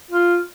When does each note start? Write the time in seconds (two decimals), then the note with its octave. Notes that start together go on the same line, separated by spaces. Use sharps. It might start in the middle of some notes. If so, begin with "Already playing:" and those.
0.10 F4